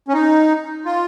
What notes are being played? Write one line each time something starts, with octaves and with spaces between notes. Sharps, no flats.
C#4
D#4
F4